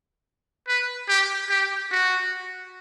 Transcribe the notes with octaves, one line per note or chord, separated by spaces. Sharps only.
B4
G4
G4
F#4